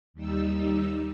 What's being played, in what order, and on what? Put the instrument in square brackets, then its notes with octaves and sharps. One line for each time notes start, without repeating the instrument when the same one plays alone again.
[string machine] D#2 G3 D#4 E6